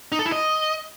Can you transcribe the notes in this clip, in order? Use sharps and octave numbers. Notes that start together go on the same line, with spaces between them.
D#4
A4
E4
D#5